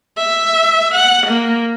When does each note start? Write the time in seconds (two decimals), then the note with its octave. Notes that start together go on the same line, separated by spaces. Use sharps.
0.18 E5
0.94 F#5
1.27 A#3